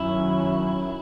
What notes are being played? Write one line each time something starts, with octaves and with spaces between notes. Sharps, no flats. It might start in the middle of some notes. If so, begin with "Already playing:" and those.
Already playing: F#2 D#3 F#3 C#4 E4